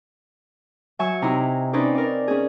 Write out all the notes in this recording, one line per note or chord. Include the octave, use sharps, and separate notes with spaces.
F#3 E5 G#5 C#6 E6
C3 D#4 E4 A#5 C6
C4 C#4 D#4 B4 C5 D5
A#4 D5
C#4 G#4